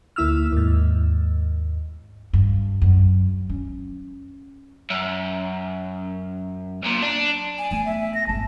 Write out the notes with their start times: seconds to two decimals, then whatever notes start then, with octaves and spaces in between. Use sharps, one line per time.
0.16 D2 A#3 E4 E6 F6
0.52 D#2 G#2
2.33 G2
2.82 F#2
3.49 C#4
4.90 F#2
6.83 B1 A#2
7.02 D4
7.58 G#5
7.71 A3 B3 G#5
7.85 E5
8.14 A#6
8.27 G#1 A3 A5